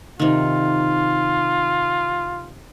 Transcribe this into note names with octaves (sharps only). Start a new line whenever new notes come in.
C3 D#3 F4